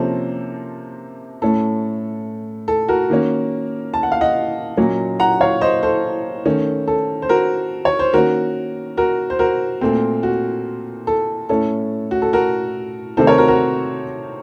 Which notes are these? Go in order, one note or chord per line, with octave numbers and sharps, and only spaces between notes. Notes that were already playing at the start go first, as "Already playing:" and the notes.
Already playing: C3 F3 A#3 C#4 A4 C5
A2 A3 C#4 A4
A4
F#4 A#4
D#3 A#3 C#4
A5
F#5
F5
D#5 F#5
A#2 F#3 A#3 C#4
F#5 A#5
C#5 F5
C5 D#5
A4 C5
D#3 A3 C#4
A4
C5
F#4 A#4
C#5
C5
D#3 A#3 C#4 F#4 A#4
F#4 A#4
C5
F#4 A#4
A#2 A3 C4
F#4
A4
A2 A3 C#4 A4
F#4
A4
F#4 A#4
C3 D#3 A3 C4 A4 C5
A#4 C#5
F#4 A#4
F#4 A#4